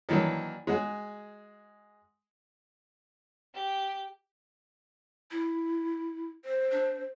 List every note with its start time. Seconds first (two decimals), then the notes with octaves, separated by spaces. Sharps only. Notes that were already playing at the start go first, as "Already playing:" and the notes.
0.09 D#3 E3 F#3 A#3 D4
0.67 G#3 F#4 G#4
3.55 G4
5.31 E4
6.45 C5
6.71 D4